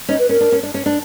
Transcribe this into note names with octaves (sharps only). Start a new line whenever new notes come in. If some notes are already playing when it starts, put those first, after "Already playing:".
C#4 D#4
B4
C#4 A#4
D4
C#4
D4
C#4
D4